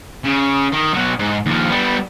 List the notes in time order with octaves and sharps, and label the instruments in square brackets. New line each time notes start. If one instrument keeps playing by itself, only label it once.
[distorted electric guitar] C#3
D#3
B2 F#3
G#2
D#2 F3
G3 B3